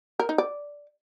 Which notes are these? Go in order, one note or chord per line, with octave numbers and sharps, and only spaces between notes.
A#4
D#4
D5